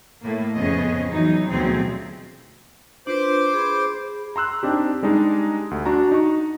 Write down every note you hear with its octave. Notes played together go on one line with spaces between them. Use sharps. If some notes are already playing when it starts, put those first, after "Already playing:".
A2 A#3
F2 C#3 B3 C#4 G#4 D#5
E3 F#3 D#4
D2 B2 F3 F#3 C4 G#4
D4 F4 B4 C5 D6
G#4 B5
A#5 C6 E6 F#6
C4 D4 D#4 G4
G3 G#3 D4 D#4
D2
D4 F#4 A#5
D#4 C#6